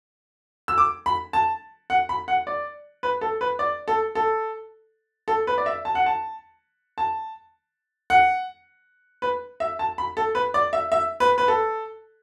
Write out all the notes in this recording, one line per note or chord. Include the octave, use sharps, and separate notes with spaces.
E6
D6
B5
A5
F#5
B5
F#5
D5
B4
A4
B4
D5
A4
A4
A4
B4
D5
E5
A5
F#5
A5
A5
F#5
B4
E5
A5
B5
A4
B4
D5
E5
E5
B4
B4
A4